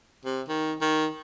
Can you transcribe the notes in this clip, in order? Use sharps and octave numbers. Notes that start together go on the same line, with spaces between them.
C3
D#3
D#3